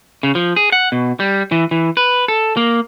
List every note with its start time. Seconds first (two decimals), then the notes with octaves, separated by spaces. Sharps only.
0.23 C#3
0.35 F3
0.56 G#4
0.72 F#5
0.92 B2
1.20 G3
1.52 E3
1.71 E3
1.97 B4
2.28 A4
2.57 A#3